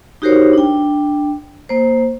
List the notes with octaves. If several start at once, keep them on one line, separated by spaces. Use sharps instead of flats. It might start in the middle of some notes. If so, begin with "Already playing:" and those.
D#4 F#4 G4 A#4 C5 C#5
D4 G5
A#3 C5